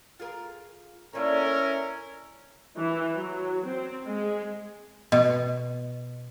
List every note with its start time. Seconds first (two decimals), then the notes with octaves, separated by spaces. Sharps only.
0.20 F4 G#4 A#4
1.13 A#3 C#4 D4 E4 A4 A#4
2.78 E3
3.16 F#3
3.67 C4
4.06 G#3
5.12 B2